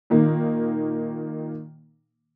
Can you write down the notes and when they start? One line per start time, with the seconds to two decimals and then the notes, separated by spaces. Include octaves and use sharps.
0.10 A#2 D#3 A#3